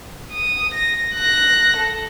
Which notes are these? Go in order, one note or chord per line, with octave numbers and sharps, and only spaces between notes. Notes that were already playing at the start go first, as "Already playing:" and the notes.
D#6
A#6
F#6 A#6
A4